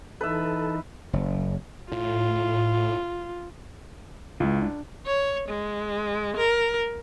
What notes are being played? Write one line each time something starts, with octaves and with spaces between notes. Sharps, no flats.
E3 D#4 A4 B4 E5
F#1
A2 F4
C#2 G#3 E4 F4
D4
C#5
G#3
A#4